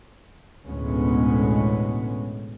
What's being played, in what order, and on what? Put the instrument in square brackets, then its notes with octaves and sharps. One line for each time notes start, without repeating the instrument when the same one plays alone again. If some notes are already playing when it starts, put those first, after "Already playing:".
[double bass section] A1 D2 B2 G#3 B3 C#4